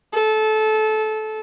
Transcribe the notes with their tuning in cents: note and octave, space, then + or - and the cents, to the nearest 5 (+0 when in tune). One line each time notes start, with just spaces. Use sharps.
A4 -20